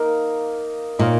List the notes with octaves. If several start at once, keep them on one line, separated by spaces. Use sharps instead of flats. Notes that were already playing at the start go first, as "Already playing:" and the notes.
Already playing: A#3 D#4 A#4 F5
A#2 D#4 A#4 C#5 F5